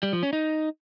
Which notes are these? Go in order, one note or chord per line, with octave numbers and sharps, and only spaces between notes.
G3
F3
C#4
D#4